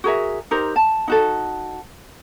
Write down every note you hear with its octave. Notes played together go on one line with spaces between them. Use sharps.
F#4 G#4 A#4 E5
D#4 G4 A#4 C5
A5
D#4 F#4 A4